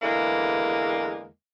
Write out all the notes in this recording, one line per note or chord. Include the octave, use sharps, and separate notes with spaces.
E2 D3 E3 G#3 A#3